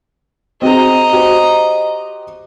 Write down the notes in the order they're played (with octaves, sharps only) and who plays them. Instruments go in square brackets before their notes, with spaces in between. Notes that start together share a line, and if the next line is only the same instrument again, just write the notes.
[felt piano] C4 F#4 G#4 [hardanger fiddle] D#5 A#5
[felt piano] F#4 G4 C5